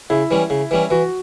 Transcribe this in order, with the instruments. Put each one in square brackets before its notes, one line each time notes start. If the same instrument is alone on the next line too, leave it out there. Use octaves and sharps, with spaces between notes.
[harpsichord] C#3 [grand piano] E4
[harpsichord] E3 G3 C#4
C#3
E3 G3 C#4
[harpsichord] E3 [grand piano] F#4